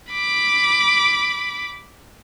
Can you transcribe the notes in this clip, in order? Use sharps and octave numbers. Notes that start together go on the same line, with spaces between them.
B5 D6